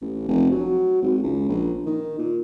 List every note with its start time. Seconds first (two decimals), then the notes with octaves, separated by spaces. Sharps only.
0.02 A1
0.28 F1
0.51 F#3
1.02 G#1
1.23 C#2
1.49 A#1
1.86 D#3
2.19 A#2